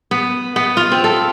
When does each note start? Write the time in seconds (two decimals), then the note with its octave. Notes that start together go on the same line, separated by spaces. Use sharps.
0.11 B3
0.56 B3
0.77 F4
0.92 C4
1.04 A4